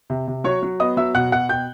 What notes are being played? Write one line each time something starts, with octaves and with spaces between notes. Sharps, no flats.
C3
C3
F#3 C#5 C#6
F#3
B3 D#5 D#6
F#3 E5 E6
B2 F#5 F#6
B2 F#5 F#6
B2 G5 G6